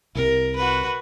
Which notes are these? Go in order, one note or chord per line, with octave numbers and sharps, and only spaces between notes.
C2 C3 A#4
F#4 B4